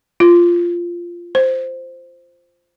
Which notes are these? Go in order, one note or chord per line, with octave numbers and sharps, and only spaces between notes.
F4
C5